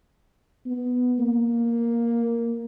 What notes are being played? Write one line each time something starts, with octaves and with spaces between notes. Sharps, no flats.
B3
A#3